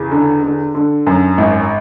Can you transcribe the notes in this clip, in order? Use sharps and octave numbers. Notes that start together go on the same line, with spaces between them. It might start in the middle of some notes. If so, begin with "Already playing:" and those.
Already playing: E2 C#3
D3
D3
D3
F#2
G#1